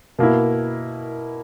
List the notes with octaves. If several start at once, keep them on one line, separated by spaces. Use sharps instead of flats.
B2 A#3 E4